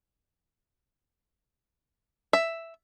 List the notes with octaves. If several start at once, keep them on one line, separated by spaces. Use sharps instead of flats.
E5